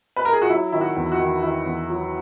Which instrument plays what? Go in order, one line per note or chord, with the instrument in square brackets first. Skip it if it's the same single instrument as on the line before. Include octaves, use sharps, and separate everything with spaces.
[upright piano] B4
A#4
G#4
F#4
F#3 E4
D#3 E4
F#4
E2
F#4
D#3
D#3 E4
E2
F#3